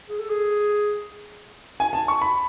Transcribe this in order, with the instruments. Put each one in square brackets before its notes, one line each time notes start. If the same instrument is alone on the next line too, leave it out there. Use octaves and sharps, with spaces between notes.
[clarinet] G#4
A4
G#4
[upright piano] G#5
A5
C#6
B5